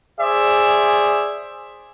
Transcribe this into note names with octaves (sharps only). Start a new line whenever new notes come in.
G#4 C5 D5 E5